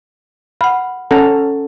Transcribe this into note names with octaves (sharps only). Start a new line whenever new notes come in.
F5 F#5 B5
C#4 A4 F#5 A#5